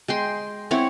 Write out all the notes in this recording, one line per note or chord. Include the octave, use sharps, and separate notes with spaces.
G#3 G5 C6
C4 E4 C#5 F#5